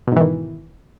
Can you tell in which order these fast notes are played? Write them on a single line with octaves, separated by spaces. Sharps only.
B2 G#2 E3 D#3